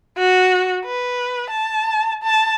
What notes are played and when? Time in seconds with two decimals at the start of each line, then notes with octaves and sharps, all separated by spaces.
0.18 F#4
0.85 B4
1.50 A5
2.23 A5